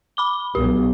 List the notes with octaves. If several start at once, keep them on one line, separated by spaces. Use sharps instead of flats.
B5 D6 G7
B1 G4